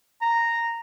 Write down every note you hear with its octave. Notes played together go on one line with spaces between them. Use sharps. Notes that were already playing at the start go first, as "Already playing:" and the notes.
A#5